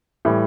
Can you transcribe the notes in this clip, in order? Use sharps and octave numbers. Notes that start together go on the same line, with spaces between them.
A2 E3 G3